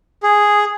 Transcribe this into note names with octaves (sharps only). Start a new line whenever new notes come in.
G#4